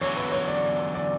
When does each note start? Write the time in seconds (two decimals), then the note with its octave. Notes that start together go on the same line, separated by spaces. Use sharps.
0.01 E2 D3 F#3 C#4 C#5
0.17 B4
0.32 C#5
0.48 D5
0.95 D5